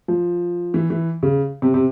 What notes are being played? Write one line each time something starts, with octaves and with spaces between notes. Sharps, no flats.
F3
E3
E3
C#3
C3
C3